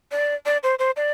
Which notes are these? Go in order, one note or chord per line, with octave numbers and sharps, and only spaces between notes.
D5
D5
C5
C5
D5